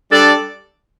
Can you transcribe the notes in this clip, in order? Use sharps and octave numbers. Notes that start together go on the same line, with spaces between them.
G3 D4 A4 D5